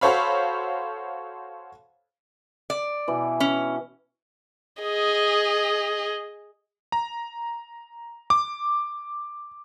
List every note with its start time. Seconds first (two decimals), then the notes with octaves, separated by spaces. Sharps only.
0.01 F#4 A4 C5 C#5 F5 B5
2.70 D5
3.08 B2 E3
3.40 C#4
4.82 G#4 D#5
6.92 A#5
8.30 D6